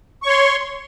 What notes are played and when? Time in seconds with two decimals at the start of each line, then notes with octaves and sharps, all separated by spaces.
0.23 C#6
0.26 C#5
0.29 C6